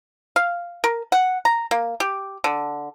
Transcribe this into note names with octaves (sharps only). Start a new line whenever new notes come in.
F5
A#4
F#5
A#5
A#3
G4
D3